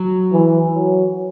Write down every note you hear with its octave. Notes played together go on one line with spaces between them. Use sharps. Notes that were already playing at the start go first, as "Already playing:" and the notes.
Already playing: F#3
E3
F#3